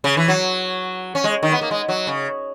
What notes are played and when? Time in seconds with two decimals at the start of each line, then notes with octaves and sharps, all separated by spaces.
0.04 C#3
0.17 E3
0.28 F#3
1.15 C#4
1.24 G#3
1.43 D#3
1.52 B3
1.61 A#3
1.71 G#3
1.89 F#3
2.07 C#3